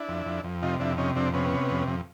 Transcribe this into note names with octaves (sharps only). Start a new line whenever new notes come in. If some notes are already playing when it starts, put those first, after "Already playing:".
Already playing: D4 E4
F2
F2
F2
C3 D#4 F4
F2 D4 E4
C3 C#4 D#4
F2 C4 D4
C3 B3 C#4
C3
F2
F2